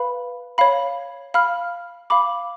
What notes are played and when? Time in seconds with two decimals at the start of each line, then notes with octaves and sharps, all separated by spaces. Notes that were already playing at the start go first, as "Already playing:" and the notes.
Already playing: B4 F5 B5
0.58 C#5 F5 B5
1.34 F5 B5 F6
2.10 F5 B5 D6